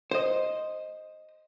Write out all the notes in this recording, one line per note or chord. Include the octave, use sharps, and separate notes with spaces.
C5 D#5